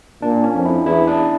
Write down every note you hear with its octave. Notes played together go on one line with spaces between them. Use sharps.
A#2 D4
C#4
F2
E4
E2 E4
D4